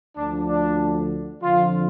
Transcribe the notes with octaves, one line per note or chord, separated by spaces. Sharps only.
D2 D3 F3 D4
D4
F2 D3 F3 F4